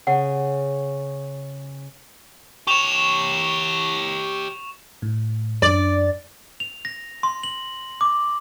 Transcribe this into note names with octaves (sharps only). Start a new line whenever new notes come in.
C#3 F#5
G4 C#5 C#6 E7 F7
A2
F#2 D4 D5 A6
F7
A#6
C6
F#7
D6